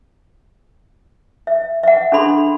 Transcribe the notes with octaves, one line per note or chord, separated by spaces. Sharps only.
E5
E5 F#5
D4 A4 B5 C6